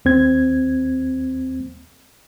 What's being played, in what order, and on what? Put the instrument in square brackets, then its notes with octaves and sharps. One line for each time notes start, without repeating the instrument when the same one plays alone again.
[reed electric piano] D#2 C4 G#6